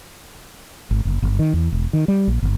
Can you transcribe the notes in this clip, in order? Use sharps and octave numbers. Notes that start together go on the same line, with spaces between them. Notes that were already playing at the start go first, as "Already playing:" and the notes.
G#1
F#1
G1
D#3
E2
E1
D#3
G3
A#1
G1